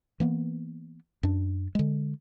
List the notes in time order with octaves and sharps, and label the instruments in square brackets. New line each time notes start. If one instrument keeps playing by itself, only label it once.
[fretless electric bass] E3 A#3 B3
F#2 D4
D3 G#3